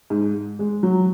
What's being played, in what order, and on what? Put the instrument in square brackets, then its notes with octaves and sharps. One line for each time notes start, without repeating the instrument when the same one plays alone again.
[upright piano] G#2
G#3
F#3